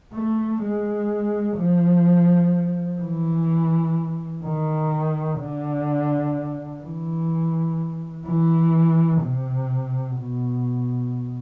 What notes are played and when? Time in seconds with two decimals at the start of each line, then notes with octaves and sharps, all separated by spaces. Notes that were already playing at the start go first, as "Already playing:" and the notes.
0.14 A3
0.61 G#3
1.57 F3
3.00 E3
4.44 D#3
5.40 D3
6.83 E3
8.26 E3
9.22 C3
10.18 B2